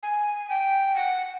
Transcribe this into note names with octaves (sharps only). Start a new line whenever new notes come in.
G#5
G5
F#5